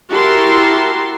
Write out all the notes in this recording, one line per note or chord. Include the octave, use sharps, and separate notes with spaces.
E4 F#4 G4 A#4 A5 C6